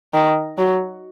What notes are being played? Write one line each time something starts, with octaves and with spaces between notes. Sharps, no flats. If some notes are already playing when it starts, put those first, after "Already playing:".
D#3
F#3